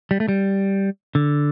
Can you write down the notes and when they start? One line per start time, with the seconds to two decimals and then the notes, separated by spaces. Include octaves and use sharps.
0.11 G3
0.20 A3
0.29 G3
1.15 D3